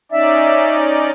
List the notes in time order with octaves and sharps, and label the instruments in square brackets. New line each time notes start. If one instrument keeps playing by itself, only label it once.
[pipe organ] C#4 D#4 D5 [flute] E5